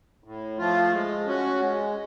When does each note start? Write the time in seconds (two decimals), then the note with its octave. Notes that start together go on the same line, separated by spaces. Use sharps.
0.24 A2
0.58 F3 A3 F4
0.92 G#3
1.27 C#4 F#4
1.60 G#3